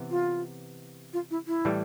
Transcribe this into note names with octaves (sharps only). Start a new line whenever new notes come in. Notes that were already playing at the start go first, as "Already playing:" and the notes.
Already playing: C3 E3 B3
F4
F4
E4
E4
A2 E3 G3